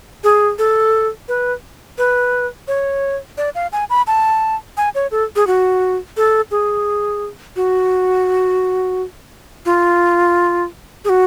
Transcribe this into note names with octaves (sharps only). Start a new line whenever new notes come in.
G#4
A4
B4
B4
C#5
D5
F5
G#5
B5
A5
G#5
C#5
A4
G#4
F#4
A4
G#4
F#4
F4
G#4
F#4